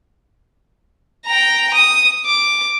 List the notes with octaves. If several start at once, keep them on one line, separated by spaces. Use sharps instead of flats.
G5 A#5
D#6
D6